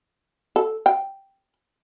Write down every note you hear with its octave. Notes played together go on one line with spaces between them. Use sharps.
A4
G5